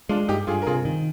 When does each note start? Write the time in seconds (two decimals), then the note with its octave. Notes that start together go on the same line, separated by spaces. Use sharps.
0.09 G#3 D4 F4
0.28 G2 D#4 G4
0.47 G2 F4 G#4
0.62 A#4
0.66 C3 F4 G#4
0.85 D#3